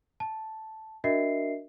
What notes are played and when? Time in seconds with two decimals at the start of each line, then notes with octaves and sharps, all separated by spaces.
0.20 A5
1.04 D4 F#4 A#4 D#5 E5 C7